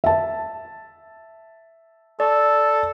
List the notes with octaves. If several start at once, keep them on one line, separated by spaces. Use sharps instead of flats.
E5 A5
A4 D5